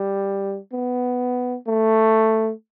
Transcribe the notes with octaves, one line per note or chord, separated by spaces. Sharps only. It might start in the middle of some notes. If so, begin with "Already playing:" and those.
Already playing: G3
B3
A3